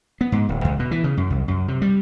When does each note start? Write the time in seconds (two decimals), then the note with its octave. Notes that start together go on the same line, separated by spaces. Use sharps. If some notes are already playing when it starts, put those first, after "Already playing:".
0.21 B3
0.32 G#2
0.49 D1
0.64 C#2
0.79 B2
0.91 E3
1.04 C#3
1.17 F#2
1.30 C2
1.48 F#2
1.68 C3
1.82 G3